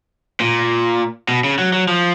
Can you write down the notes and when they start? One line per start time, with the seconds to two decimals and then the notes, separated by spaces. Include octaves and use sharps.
0.40 A#2
1.28 B2
1.44 C#3
1.59 F#3
1.73 F#3
1.88 F3